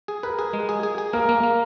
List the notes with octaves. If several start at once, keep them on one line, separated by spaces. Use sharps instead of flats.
G#4
A#4 B4
G#4
G#3
G#4
G#4
G#4
A#3 A#4
A#3
A#3